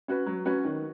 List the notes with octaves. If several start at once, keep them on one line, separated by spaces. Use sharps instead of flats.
C#4 F#4 B4
F#3
C#4 F#4 B4
D#3